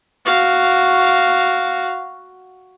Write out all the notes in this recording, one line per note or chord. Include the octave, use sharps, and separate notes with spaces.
F#4 F5